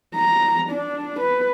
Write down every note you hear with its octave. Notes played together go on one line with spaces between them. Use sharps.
A#5
D4
B4